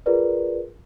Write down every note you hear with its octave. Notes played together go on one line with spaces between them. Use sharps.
F4 G#4 A#4 B4 D5